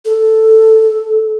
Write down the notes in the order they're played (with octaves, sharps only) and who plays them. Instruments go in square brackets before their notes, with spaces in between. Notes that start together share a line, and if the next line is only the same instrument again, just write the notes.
[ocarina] A4